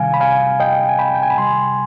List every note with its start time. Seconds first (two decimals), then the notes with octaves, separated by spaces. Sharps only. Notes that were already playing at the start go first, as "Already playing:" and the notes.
Already playing: C3 D#3 G3 F5 G#5
0.14 B5
0.20 F5 G#5
0.60 D#5 G5
0.89 G#5
0.99 G5 B5
1.15 G5
1.23 G#5
1.30 B5
1.38 C3 G3 G#5 C6